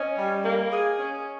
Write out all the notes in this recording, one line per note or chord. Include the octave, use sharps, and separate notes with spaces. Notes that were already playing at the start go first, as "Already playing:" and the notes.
Already playing: C#4 D#5
G3
A#3
G#4
C#4